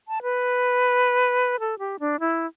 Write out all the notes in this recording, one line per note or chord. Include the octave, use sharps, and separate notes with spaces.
A5
B4
A4
G4
D4
E4